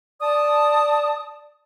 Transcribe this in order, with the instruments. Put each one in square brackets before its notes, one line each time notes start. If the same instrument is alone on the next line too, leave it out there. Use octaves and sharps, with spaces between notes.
[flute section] D5 A5 D#6